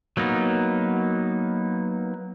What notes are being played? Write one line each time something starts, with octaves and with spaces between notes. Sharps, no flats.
F#3 A#3 B3 D#4